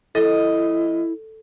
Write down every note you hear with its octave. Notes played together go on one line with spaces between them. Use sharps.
F2 E4 A4 D#5